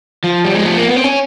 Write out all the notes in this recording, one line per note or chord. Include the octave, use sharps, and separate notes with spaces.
F3
G3
G#3
A3
A#3
B3
C4
C#4